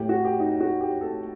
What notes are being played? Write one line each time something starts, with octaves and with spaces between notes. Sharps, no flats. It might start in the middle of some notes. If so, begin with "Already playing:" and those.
Already playing: A2 A3 G4
F#4
G4
D#4
F#4
G4
A4